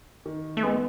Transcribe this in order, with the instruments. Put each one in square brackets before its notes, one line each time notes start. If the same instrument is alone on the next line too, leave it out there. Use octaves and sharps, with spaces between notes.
[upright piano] D#3
[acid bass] A3
[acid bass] G#3 [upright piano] B3